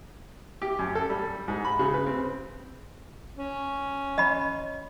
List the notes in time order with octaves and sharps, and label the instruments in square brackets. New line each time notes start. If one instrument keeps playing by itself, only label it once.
[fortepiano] G4
F#2
A4
G3
G#2
B5
C#3
B4
C4
[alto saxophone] C#4
[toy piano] D#5 B5